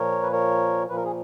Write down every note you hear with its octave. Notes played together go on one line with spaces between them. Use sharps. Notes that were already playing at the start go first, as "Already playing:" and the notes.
Already playing: A#2 F3 A#4 C#5
B4
A#4 C#5
A#2 F3 B4
A#4
G#4